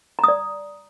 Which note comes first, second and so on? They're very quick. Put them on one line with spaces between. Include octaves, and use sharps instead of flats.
A#5 D#6 D5